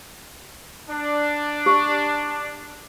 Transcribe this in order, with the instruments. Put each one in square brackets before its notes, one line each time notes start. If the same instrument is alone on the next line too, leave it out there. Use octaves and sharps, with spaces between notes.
[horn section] D4
[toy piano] G4